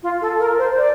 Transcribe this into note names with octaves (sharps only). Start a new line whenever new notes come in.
F4
A4
A#4
C5
D5